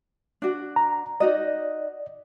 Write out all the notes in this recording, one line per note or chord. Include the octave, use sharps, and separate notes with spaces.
D4 F#4
A#5
D#4 F#4 D5 D#5